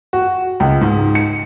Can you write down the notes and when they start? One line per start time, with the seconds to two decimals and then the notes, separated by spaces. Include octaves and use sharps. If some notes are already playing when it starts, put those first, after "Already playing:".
0.13 F#4
0.60 C#2
0.81 G#2
1.15 C#7